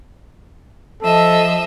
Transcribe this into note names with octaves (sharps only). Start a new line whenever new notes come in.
F3 A4 D#5 E5